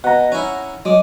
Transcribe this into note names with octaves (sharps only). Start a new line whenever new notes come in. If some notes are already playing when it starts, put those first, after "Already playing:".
B2 F#5 A#5
C#4 E4
F#3 G#3 D6